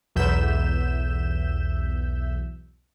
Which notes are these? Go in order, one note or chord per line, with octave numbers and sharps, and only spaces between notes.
B1 E2 E5 G6 E7